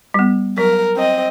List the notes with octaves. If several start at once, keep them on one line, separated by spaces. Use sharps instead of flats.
G3 B3
F#3 A#4
C4 D#5